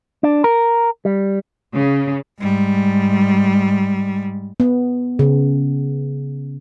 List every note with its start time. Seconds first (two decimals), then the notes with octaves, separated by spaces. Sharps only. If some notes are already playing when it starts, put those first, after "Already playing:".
0.23 D4
0.44 A#4
1.05 G3
1.75 C#3
2.41 G#2 G3
4.60 B3
5.19 C#3